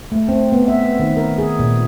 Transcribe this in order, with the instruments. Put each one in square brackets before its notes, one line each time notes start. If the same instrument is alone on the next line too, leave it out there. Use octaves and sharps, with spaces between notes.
[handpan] A3
C4
B3
E5
D#3
A#4
G#4
A#2